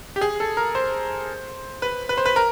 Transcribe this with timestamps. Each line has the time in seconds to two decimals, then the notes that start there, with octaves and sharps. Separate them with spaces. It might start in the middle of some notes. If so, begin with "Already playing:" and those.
0.16 G4
0.21 G#4
0.40 A4
0.57 A#4
0.75 C5
1.82 B4
2.09 B4
2.18 C5
2.26 B4
2.36 A#4